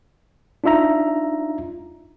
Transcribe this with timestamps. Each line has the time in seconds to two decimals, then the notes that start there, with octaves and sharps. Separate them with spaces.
0.64 D4 D#4 F4 E5 A#5